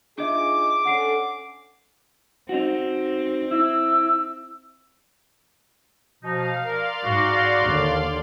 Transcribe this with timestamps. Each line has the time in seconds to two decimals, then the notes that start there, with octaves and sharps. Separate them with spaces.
0.18 D4 D#4 F4 G#4 D#5 E5 D6
0.85 C#4 D4 A4 F#5 C7 D7
2.49 C4 D#4 F#4
3.51 E4 E6
6.23 B2 F3 D#4 F5
6.65 A#4 D5 F5 C6
7.03 G#2 D#4 F#4
7.65 D#2 D3